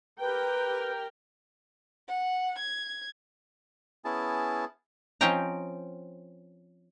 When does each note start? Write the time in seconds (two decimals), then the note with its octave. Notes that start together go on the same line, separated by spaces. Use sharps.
0.20 G4 A#4 B4 G5
2.08 F#5
2.58 G#6
4.05 B3 C#4 E4 G#4 A5
5.21 F3 C4 C#4 D#5 G5 A#5